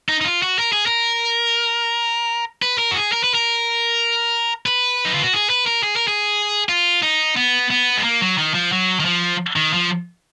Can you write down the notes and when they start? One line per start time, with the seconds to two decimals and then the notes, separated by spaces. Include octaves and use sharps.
0.09 D#4
0.21 D#4
0.25 F4
0.43 F#4
0.59 A#4
0.73 G#4
0.86 A#4
2.62 B4
2.78 A#4
2.91 F#4
2.96 G#4
3.12 A#4
3.24 B4
3.35 A#4
4.66 B4
5.05 D#4
5.14 F4
5.24 F#4
5.33 G#4
5.50 B4
5.66 A#4
5.83 G#4
5.96 A#4
6.08 G#4
6.69 F4
7.02 D#4
7.36 B3
7.70 B3
7.97 G#3
8.04 A#3
8.21 F#3
8.38 D#3
8.54 F3
8.72 F#3
9.00 D#3
9.05 F3
9.56 D#3
9.73 F3